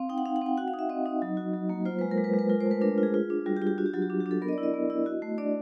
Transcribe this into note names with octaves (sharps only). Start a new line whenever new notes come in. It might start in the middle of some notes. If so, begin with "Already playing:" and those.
Already playing: C4 F5
D#4 G5
F#5
D#4 F5
F#5
C4
G5
F#4 F#5
F5
D#4
E5
C4 D#5
D#4
F#3
F#4
F#3
A#3
F4 C5
G#3 B4
A#4
G#3
B4
G#3
B4
F4 A#4
C5
A3
B4
D4 A#4
F4
G#4
F4
D4
G3 F#4
G4
F4
G4
D4 F#4
G4
F#3 F#4
G4
D4
G4
D4
A4
B3 A#4
D#5
D5
E4
D#5
B3
E4
F#4
A3
D4 D5